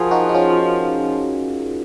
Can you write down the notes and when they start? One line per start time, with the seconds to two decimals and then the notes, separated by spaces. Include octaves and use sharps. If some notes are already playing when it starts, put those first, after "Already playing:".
Already playing: F3 F4 F#4 G#4 A#4
0.11 D#4 F#4
0.29 D#4
0.35 C#4 F4